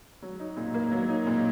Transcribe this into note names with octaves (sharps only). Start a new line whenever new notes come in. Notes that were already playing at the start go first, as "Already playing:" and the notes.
F#3
D#4
A#2
A#3
F#3
D#4
A#2